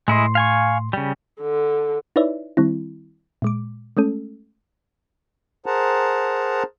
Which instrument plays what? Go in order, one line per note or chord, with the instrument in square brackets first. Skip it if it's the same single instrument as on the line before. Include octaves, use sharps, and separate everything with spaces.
[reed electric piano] A2 C6 [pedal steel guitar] G#3 E4 D#5
[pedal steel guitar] F5 G#5 C#6
C#3 G3
[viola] D3
[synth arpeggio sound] D#4 E4 B4 C#5 D5 E5
D#3 G3 C4 E4
A#2 G#3 D6
G#3 A3 C#4 A4
[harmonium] G#4 A#4 C5 F#5 A5 A#5